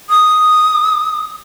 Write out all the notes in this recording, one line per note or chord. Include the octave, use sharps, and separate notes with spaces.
D#6